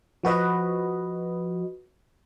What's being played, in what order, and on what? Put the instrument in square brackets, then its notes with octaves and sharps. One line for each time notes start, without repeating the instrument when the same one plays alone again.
[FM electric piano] F3 F#4 B4 D#5